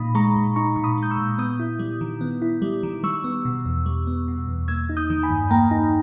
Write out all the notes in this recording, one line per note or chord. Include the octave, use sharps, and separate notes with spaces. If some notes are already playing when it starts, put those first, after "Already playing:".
Already playing: A#2 D#4 B5 D#6
G#3 A#5 C#6
A#2
D#4 A#5 C#6
A#2 C#6
B5 D#6
G#3
G6
C#6 E6
A#2
B3 D#6 G6
E4
G3
D#3
B3
E4
G3
D#3
G3 C#6 E6
B3
B2
E2
G3
B3
B2
E2
A#3 E6 G#6
D#4
D#6 G6
D#3
G#5 B5
G2
A#3 G5 A#5
D#4